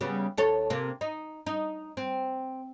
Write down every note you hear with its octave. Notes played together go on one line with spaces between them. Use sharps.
C#3 G3 B3
D#2 A4 C#5
C3 A#3
D#4
D#4
C4